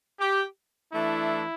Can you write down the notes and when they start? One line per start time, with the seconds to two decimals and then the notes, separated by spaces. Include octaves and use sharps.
0.20 G4
0.93 E3 A3 D4 E4